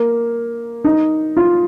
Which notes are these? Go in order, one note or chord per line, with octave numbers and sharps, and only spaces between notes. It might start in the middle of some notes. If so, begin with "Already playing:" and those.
Already playing: A#3
D#4
F4